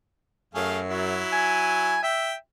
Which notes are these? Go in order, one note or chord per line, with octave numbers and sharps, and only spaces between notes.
F#2 A3 G#4 F5
F#3 E4
G#5
E5 G5